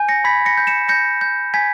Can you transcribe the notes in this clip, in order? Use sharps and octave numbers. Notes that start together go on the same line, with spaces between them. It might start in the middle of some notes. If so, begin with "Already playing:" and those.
Already playing: G#5 G6
A#6 C#7
B5 G#6 B6
A#6 C#7
G6
C#7 E7
G6 A#6 C#7
G6
G#5 G#6 B6